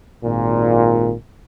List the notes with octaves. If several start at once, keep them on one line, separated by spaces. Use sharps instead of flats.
G#1 A#2